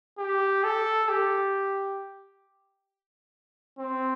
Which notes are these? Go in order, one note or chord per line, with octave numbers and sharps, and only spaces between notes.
G4
A4
G4
C4